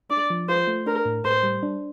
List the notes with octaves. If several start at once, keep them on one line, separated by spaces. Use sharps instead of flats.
D4 D5
F3
F4 C5
A3
D4 A#4
A2
A2 C5
G3
D4